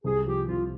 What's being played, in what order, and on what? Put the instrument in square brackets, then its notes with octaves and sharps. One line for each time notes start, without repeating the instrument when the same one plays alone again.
[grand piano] C2 [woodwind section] G#4
[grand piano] F3 [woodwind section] G4
[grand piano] C2 [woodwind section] F4